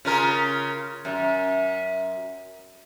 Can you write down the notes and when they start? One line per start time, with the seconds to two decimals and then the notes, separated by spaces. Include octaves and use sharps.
0.05 C#3 F4 A#4
1.05 F#2